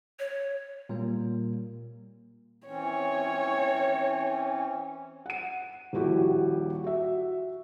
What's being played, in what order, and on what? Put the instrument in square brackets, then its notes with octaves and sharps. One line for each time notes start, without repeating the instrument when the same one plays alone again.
[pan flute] C#5
[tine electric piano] A#2 G3 A#3
[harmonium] E3 C4 C#4 [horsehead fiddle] C#5
[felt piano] F#5 D#7
D#1 A#1 E4 F#4 G4
F#4 E5